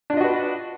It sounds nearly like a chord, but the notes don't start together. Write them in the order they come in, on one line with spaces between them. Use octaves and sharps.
D4 F4 D#5 F#4 B4